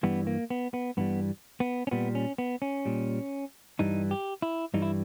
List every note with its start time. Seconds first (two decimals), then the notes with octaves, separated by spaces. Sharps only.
0.03 G2 E3 G3 B3
0.27 A#3
0.50 B3
0.74 B3
0.97 G2 E3 G3 B3
1.60 B3
1.87 C#4
1.91 A#2 G3 B3
2.15 C#4
2.38 B3
2.62 C#4
2.85 A#2 G3
3.79 G2 E3 G3 D#4
4.11 G4
4.42 E4
4.74 G2 E3 G3 D#4
4.82 E4